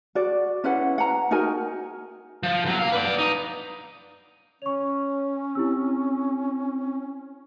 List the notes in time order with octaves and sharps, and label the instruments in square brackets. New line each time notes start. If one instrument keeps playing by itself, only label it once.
[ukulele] F#4 D5
C#4 E4 B4 F#5
F#5 A#5
D#4 F#4 A#4 G#5
[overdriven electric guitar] F3
E2 F#3
A#3 F5
B4 D5
D#4
[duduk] C#4 [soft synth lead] C#5 [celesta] C#6 F7
[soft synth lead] C4 [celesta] E4 G4 E6